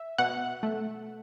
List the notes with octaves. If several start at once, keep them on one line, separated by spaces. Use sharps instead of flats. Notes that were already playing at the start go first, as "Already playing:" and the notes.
Already playing: E5
B2 F#5
A3